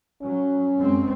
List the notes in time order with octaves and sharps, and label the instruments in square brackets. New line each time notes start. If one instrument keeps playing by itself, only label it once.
[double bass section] F#3 [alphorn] C#4
[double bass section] F#2 G#3 C4